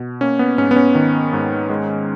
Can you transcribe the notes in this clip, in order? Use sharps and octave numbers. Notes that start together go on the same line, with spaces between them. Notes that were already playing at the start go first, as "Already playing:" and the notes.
Already playing: B2
A#3 C#4
B3
G#2 C#4
B3
C#4
D#3
G#2
G#3